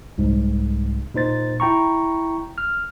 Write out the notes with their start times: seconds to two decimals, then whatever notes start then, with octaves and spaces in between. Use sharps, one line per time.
0.18 C2 G#2
1.14 A#2 D#4 C5 A6
1.60 E4 G5 A#5 C#6
2.58 F6